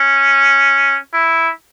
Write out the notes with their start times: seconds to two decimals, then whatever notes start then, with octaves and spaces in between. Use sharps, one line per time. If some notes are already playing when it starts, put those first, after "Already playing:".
Already playing: C#4
1.13 E4